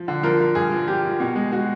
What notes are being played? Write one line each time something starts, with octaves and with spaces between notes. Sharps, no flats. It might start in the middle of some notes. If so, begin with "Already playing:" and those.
Already playing: F3
D3
F3 A#4
F3
G2 G#4
F3
F3 G4
F3
B2
G#3
G#3 F#4